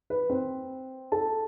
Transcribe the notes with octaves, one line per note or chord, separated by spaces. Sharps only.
B4
C4 C5
A4 A5